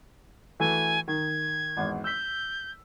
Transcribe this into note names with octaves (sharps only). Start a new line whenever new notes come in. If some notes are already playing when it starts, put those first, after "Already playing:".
E3 A3 F#4 G#5
D#3 G#6
G#1 E2
E6 G6 B6